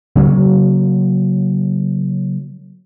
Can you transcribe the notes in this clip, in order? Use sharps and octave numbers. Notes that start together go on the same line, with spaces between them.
C#3 F#3 A#3 C#4